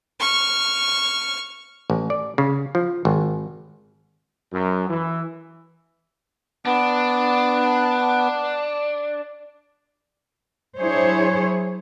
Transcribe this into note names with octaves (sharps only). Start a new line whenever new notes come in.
C#6 F6
A1
D5
C#3
F3
G#1
F#2
E3
B3 D4
F#3 D4 E4 G#4 C5 C#5